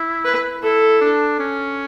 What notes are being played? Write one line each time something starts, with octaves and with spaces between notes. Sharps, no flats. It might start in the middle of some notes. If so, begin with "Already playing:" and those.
Already playing: E4
B4
E4 A4
D4
C#4